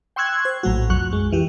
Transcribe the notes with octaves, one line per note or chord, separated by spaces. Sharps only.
G5 C6 C#6 E6 F#6 G#6
C5
A#1 A2 F#3 A3 F#4
B1 F2 F#3 C#6 F#6
F#2 G#3
F2 E3 G4